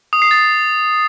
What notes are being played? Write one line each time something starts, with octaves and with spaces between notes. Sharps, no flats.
D#6
C7
A6